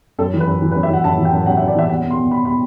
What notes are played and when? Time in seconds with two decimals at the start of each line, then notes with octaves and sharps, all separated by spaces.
0.19 F#2 A4
0.34 E3
0.40 B4
0.47 F#2
0.62 E3
0.71 B4
0.76 F#2
0.83 E5
0.90 E3 F#5
1.04 F#2 A5
1.18 E3
1.25 G5
1.32 F#2
1.46 F#2 F#5
1.57 E5
1.60 F#2
1.68 D5
1.75 E3 E5
1.89 E2 F#5
2.03 B2
2.11 C6
2.17 B2
2.31 B2 B5
2.45 B2 B5